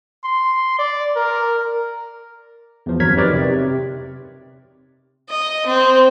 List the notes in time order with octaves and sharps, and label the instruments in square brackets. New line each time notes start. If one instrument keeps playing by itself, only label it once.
[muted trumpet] C6
D5
A#4
[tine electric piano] E2 F3
G1 F2 F#3 A#4 G#6 B6
D#4 G4 A#4 B4 C#5 D5
C3
C3
[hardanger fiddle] D#5
C4